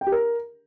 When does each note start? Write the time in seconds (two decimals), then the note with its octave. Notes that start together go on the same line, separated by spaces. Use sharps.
0.01 G5
0.07 G4
0.12 A#4